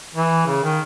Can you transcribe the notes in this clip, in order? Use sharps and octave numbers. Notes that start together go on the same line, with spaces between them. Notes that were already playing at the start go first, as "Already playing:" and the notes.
E3
C#3
D#3